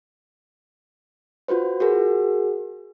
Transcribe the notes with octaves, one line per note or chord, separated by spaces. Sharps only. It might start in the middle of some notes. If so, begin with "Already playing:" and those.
F4 F#4 B4 C5
F#4 G#4 A#4